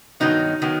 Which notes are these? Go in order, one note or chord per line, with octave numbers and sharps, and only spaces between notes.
G2 D#3 F#3 B3 D#4
D#3 F#3 B3